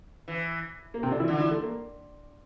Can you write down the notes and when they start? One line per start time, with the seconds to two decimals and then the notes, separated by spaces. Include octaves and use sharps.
0.28 E3
0.94 A#3
1.03 C3 C4
1.11 D3 D4
1.20 E3 E4
1.28 D3
1.39 E3 E4
1.51 A3
1.62 A#3